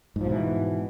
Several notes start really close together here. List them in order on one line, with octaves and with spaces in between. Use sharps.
G#2 F3 B2 E3